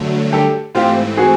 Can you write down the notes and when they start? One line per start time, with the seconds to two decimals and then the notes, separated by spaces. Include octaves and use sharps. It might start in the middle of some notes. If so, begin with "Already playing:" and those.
Already playing: G2 D3 F#3 A3
0.32 G4 A4
0.75 G#2 E3 A3 C4 F4 G4
1.17 F#4 G#4